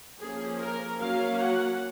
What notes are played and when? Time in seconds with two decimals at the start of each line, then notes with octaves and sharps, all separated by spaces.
0.19 F3 A#3 C#4 G#4
0.60 A#4
0.99 F#3 A#3 C#4 F5
1.39 F#5